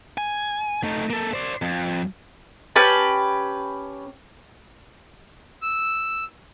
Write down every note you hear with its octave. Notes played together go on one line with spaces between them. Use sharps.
G#5
A3 D#4
A#3 A4
C5 D5
F2
C#4 G4 B4 A5
E6